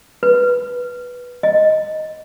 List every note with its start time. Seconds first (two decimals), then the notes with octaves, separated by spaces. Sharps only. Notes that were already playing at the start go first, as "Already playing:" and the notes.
0.23 B4
1.43 D#5